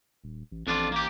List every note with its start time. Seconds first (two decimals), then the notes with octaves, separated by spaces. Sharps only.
0.24 D#1
0.51 A1
0.67 A1 F2 D4 F4
0.92 A1 A#3 G4